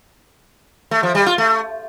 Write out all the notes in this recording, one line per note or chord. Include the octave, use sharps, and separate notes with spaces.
A3
F3
G3
F4
A3